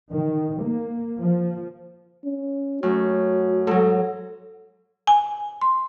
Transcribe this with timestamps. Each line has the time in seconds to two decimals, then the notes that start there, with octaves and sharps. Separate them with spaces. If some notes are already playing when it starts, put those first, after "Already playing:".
0.11 D#3
0.63 A#3
1.17 F3
2.25 C#4
2.83 F#2 A3 F#4
3.67 G#2 F#3 A4
5.07 G#5
5.62 C6